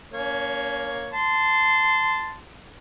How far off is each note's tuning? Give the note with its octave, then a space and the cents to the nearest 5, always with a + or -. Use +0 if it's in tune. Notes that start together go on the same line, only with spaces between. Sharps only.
A#3 +0 C#4 +40 C#5 +0
A5 +0 C6 -15